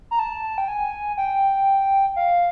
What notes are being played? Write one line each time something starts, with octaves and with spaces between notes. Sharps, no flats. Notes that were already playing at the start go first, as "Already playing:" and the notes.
A#5
A5
G5
G#5
G5
F5